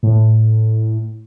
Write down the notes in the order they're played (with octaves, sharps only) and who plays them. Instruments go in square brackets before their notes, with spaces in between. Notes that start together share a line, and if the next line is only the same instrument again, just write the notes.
[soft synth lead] A2